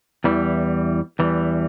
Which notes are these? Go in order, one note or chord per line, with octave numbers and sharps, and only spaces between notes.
E2 E3 G3
E2 E3 G3